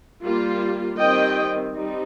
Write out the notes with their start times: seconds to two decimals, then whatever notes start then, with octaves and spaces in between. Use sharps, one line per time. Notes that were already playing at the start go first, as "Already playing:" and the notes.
0.24 G3 A#3 F4
0.98 D#3 G3 C4 D#5 G5
1.73 G3 C4 D#4